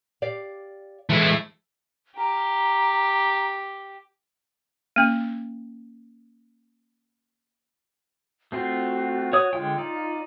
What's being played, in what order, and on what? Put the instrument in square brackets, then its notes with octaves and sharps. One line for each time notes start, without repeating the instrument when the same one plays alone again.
[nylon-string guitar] G4 D5 F5
[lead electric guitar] E3 G#3 [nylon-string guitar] F3 [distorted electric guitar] A3 E4
[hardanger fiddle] G4 [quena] A#5
[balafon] A#3 C#4
[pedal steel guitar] A3 C4 F4 [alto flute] F#4
[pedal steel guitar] C#5 D5 D#6
[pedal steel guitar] D3 G#3 G5 [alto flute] F4
[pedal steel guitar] D#4 D5